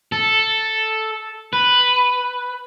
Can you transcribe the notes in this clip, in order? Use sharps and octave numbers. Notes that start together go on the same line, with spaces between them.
A4
B4